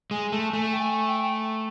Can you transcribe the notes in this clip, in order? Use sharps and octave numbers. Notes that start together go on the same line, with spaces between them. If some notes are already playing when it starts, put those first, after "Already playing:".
G#3 G#5
A3 A5
A3 G#5
G5
G#5
G5